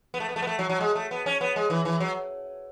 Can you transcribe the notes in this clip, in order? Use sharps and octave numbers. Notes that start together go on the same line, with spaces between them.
B3
A3
B3
A3
B3
A3
F#3
F#3
G#3
A3
B3
C#4
B3
G#3
E3
E3
F#3